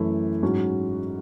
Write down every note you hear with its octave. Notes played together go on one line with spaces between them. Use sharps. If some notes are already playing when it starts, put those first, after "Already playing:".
Already playing: F#2 E3 A3 E4
G#2 F#3 C#4 F#4